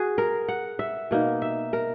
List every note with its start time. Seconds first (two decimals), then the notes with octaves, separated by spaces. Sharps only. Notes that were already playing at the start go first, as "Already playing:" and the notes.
Already playing: F#4 G#4
0.18 A#4
0.48 F#5
0.79 E5
1.11 B2 A#3 D#4
1.42 E5
1.73 A#4